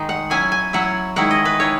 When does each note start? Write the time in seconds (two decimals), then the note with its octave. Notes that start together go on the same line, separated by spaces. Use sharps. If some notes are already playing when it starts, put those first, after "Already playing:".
Already playing: D#3 G#3 D#4
0.09 F#5
0.30 F#3 C#4 E4 G#5
0.52 G#5
0.73 F#3 C#4 E4 F#5
1.16 D#3 G#3 C#4 E4 F#5
1.31 D#5
1.45 B4
1.59 D#3 G#3 C#4 E4 C#5